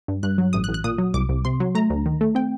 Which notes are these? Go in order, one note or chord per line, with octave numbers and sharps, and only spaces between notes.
G2
G2 F#6
F#3
A1 D#6
F#6
A1
F#6
A#2 D#6
F#3
C2 D6
C2
C3 C6
F#3
A3 A#5
D2
D#3
A3
C4 G5